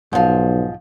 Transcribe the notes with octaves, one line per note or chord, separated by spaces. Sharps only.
B1 G#2 F3